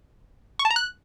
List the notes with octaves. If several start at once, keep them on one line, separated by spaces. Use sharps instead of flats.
C#6
A5
A#5
F#6